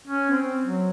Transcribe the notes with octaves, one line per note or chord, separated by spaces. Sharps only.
C#4
C4
F#3